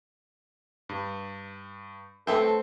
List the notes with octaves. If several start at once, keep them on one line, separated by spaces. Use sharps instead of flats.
G2
A3 C4 A4 B4 C5 E5